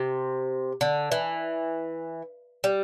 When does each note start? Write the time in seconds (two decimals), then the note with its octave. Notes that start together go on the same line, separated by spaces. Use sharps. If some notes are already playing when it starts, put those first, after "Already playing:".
Already playing: C3
0.81 D3
1.12 E3
2.64 G3